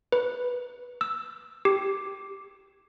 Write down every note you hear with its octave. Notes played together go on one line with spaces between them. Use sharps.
B4
E6
G4